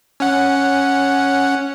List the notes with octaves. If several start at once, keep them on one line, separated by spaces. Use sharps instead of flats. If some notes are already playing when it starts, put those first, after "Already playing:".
C#4 F#5